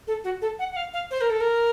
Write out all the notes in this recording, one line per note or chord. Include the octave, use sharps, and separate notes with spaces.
A4
F#4
A4
F#5
F#5
F5
F5
C5
A#4
A4
A#4